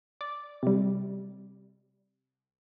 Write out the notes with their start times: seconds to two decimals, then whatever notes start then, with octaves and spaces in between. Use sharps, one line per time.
0.21 D5
0.63 C3 G3